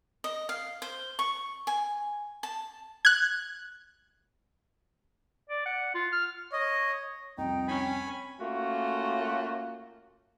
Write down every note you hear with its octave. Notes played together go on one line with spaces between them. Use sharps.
D#5
F5
C5
C#6
G#5
A5
F#6 G#6
D5
F#5
F4
F6
C#5 D#5
C2 F2 D#4 G5
C#4 G#5 B5
A3 A#3 C#4 F4 F#4